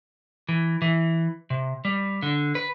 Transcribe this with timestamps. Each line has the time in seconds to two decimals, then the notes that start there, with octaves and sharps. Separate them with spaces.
0.49 E3
0.82 E3
1.50 C3
1.85 G3
2.23 D3
2.55 B4